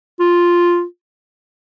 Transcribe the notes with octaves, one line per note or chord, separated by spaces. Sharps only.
F4